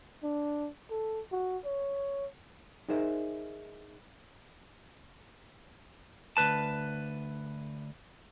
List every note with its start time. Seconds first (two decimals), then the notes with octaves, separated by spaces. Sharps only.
0.23 D4
0.91 A4
1.32 F#4
1.65 C#5
2.89 D#4 G#4 A#4 C5 E5
6.37 D2 B4 A5